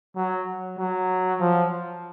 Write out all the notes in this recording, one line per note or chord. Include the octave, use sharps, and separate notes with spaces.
F#3
F#3
F3